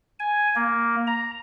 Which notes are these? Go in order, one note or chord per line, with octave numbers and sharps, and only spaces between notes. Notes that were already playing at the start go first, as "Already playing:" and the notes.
G#5
A#3
A#5